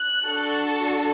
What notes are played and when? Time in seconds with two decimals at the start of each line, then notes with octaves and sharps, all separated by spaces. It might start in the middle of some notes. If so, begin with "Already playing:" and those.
Already playing: F#6
0.26 D4 F#4 A4